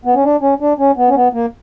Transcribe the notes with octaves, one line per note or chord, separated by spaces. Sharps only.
B3
C#4
D4
C#4
D4
C#4
B3
C#4
B3
A#3